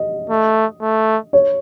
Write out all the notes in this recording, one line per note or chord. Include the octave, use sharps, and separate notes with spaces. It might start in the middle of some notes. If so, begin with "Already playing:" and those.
Already playing: D#5
A3
A3
C#5